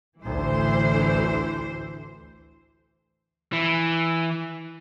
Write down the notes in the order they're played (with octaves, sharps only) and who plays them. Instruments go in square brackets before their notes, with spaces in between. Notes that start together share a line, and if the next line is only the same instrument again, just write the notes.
[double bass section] A1 D2 [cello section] E3 C5
[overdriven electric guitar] E3